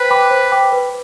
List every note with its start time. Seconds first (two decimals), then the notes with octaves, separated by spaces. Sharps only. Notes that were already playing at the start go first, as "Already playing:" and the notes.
Already playing: B4 C5 G5
0.10 G5 B5 D6
0.31 C5
0.52 G5 B5 D6
0.72 B4